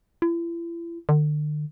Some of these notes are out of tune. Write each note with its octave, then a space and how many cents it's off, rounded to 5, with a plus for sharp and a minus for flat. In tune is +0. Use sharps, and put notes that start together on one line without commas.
E4 +40
D3 +40